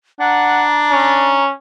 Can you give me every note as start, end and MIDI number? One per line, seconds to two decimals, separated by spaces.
0.20 1.40 62
0.20 0.66 78
0.20 1.44 82
0.91 1.52 61